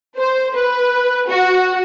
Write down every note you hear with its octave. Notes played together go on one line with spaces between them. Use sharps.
C5
B4
F#4